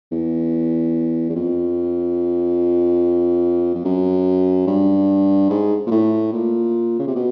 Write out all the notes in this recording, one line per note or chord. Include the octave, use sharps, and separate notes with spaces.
E2
E2
F2
F2
F#2
G2
G#2
A#2
A2
A#2
C#3
C3
B2